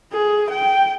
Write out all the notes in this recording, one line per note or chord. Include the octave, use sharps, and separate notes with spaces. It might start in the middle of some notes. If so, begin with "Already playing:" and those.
G#4
G5